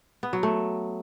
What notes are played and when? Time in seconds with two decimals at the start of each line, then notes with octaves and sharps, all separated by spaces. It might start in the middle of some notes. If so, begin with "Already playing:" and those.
0.23 B3
0.33 F#3
0.43 A3